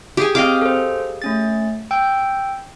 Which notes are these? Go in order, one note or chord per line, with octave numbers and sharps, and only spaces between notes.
G4 G#4 G#5
C4 D#5 F5 D6 F6
A4 C5
A3 C#4 A6
G5 E6 G6